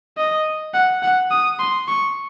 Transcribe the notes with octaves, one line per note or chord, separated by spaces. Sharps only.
D#5
F#5
F#5
D#6
C6
C#6